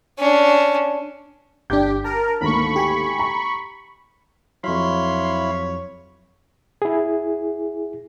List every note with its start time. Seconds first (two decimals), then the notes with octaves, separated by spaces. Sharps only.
0.19 C#4 D4
1.70 G1 D4 G4 G6
2.04 A#4 A5
2.41 G#1 D2 A#3 B5 C#6
2.76 G4 G#5
3.19 A#5
4.64 F2 F#3 E4 C#5 F5 B5 C6
6.82 E4 G#4